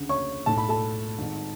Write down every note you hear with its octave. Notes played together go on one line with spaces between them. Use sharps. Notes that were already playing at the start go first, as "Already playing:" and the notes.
Already playing: D2 C#3
C#5 C#6
B1 A2 A5
B5
A4 A5
G#1 G#2